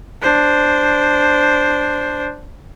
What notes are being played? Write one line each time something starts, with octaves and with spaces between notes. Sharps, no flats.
D4 C5